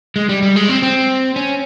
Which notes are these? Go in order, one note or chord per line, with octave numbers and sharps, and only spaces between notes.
G#3
G3
G3
G#3
C4
C4
C#4